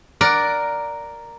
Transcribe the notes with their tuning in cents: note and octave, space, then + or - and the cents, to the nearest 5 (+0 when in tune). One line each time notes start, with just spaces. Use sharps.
A#4 +0 D5 +0 F#5 +0